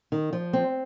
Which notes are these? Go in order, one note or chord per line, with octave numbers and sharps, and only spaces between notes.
D#3
F3
C4